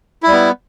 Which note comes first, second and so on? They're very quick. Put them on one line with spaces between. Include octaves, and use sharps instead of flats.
E4 G3 B3